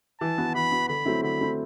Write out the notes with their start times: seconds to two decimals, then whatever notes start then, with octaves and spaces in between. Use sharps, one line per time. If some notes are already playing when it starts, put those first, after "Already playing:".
0.20 E3 A5
0.38 B3 F#4
0.55 E3 B5
0.71 B3 F#4
0.89 D3 B5
1.05 F#3 A3 C4 E4
1.23 D3 B5
1.40 F#3 A3 C4 E4